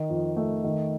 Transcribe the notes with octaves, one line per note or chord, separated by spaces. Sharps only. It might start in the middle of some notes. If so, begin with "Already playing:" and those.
Already playing: D#3
F2
A3
D#3